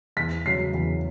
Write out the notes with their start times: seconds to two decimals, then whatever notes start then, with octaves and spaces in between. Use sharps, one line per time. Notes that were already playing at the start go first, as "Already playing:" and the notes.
0.17 E2 B6
0.46 C#3 F#3 C7
0.74 E2